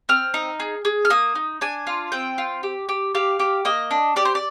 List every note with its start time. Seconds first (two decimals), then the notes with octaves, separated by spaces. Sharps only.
0.09 C4 F6
0.34 D#4
0.60 G#4
0.85 G#4
1.05 F6
1.10 A#3 D#6
1.35 D#4
1.61 D4 G#5
1.87 F4
2.12 C4 G5
2.38 F4
2.63 G4
2.89 G4
3.15 G4 F5
3.39 G4
3.65 A#3 D#5
3.91 D4
4.16 G4 D5
4.25 C5
4.35 D5